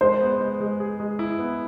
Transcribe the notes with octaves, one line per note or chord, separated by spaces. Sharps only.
G#3 C5
B3
G#3
G#3
G#4
G#3
E4
B3